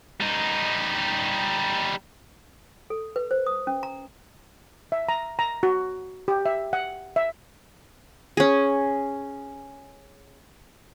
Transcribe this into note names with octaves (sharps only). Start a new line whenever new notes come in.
G3 D#4
A4
B4
C5
D#6
C#4
A#5
E5
A#5
A#5
F#4
G4
E5
F#5
E5
C#4 G#4